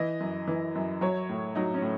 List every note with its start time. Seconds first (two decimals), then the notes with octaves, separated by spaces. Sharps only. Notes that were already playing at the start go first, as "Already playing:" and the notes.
Already playing: E3 D#5
0.20 F#2
0.47 E3
0.75 F#2
1.01 F#3 C#5
1.29 A2
1.55 F#3 D#4
1.74 C#4
1.82 A2